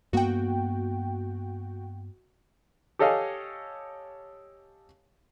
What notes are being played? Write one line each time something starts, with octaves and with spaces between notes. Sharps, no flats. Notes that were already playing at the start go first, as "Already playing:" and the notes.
G2 A#3 B3 F#4 G5
G4 A4 C#5 D#5 F5 G#5